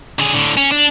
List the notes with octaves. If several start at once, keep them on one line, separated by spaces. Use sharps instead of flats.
D3 G#4
A2 D3
C#4
D4